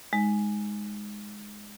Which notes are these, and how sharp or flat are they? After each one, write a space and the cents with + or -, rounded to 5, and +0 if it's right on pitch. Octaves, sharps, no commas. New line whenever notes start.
G#3 +0 D#4 +15